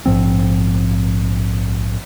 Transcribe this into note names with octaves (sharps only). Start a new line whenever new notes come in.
A#1 G#2 F3 C4